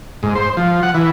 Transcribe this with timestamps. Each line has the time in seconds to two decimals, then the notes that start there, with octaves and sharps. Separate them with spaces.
0.23 G#2
0.35 C5
0.57 F3
0.83 F#5
0.94 E3